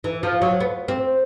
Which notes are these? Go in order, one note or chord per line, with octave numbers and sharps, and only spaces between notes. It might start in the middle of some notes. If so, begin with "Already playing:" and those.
E3
F3
F#3
B3
C4